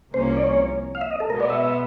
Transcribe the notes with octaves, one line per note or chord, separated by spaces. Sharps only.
C2 C3 F3 A#3 C#4 C5
D5
C#5
F5
E5
D#5
A4
B2 G#3 B3 A#4
D5
E5